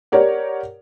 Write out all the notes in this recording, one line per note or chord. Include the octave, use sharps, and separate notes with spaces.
G4 A#4 C#5 D5 F#5